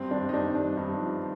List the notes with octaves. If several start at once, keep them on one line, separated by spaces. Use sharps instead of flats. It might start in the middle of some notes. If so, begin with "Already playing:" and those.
Already playing: G2 C4
G2 D4
D#4
G2 D4
G2 D4
G2 D#4
F3